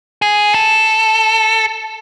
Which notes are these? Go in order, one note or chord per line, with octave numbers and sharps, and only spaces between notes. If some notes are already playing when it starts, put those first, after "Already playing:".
G#4
A4